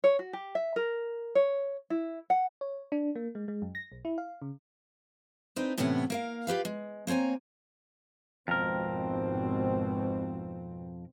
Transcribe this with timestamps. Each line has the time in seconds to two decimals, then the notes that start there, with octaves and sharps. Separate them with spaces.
0.04 C#5
0.19 F#4
0.33 G4
0.55 E5
0.76 A#4
1.35 C#5
1.90 E4
2.30 F#5
2.61 C#5
2.92 D4
3.16 A#3
3.35 G#3
3.48 G#3
3.62 F#2
3.75 A#6
3.92 B1
4.05 E4
4.18 F5
4.42 C#3
5.56 C4 D4 D#4 B4
5.78 A2 C3 E3 B3 C#4 F#5
6.10 A#3 A#4 F5
6.47 F4 G4 B4 F5
6.65 G#3
7.07 A#3 C4 C#5 G#5 A#5
8.48 G#1 F2 B2 C4 A#4